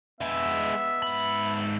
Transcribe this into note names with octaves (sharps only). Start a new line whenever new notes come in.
G#3 B3 E4 E5
G#2 B5